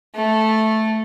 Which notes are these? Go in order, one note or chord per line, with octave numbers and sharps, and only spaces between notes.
A3